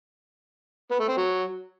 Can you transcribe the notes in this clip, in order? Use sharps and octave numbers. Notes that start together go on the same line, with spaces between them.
B3
A3
C4
F#3